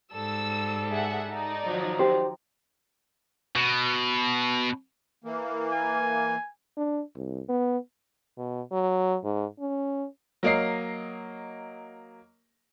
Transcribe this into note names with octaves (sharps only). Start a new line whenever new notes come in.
G#2 G3 A4 E6
G#4 E5 F#5
D#4 D5
D#3 F3 F#3
G4 C5
B2
E3 A#3
G#5
D4
C2
B3
B2
F#3
G#2
C#4
F#3 A#3 D#5 C7